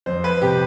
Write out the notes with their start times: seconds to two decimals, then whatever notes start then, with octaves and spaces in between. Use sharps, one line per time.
0.06 F2 C5
0.24 B4
0.42 C3 G4